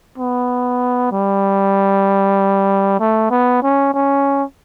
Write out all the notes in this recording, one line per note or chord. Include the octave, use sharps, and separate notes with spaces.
B3
G3
A3
B3
C#4
C#4